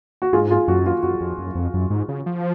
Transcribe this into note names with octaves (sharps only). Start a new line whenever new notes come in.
F#4
G#2 F4 G#4
F4 G#4
F#2 F#4
F4
F#2 F#4
F2
F#2
F2
F#2
G#2
C#3
F3